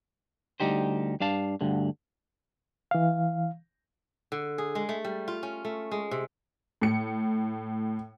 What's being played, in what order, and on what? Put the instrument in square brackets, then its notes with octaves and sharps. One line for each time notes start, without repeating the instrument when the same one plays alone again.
[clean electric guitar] D2 G3 D#4 G4 C5
G2 D4 F5 A5
D2 G2 D3
[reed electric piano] E3 F5
[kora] D3
G#4
G#3
A3
G3
F4
C#4
A3
G#3
C3
[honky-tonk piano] A2 C#7